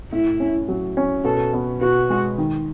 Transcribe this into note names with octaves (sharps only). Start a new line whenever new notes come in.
A2 E4
C#4
F#3
C#4
B2 A4
B3
B2 F#4
G#3
D#3